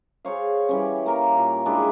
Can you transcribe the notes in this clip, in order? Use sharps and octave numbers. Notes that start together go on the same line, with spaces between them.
G#4 C5 C#5 F5
E3 G3 C#4
A#3 A#4
A#2
G#3 D4 E4